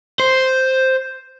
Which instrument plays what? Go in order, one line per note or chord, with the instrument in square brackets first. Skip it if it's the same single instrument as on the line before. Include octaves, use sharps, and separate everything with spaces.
[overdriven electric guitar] C5